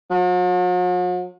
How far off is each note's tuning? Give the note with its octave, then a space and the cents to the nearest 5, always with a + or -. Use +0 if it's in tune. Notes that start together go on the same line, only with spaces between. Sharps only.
F#3 -45